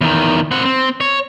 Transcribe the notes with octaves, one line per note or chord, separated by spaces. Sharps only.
E2 D#3
C4 F#5
C4
C#5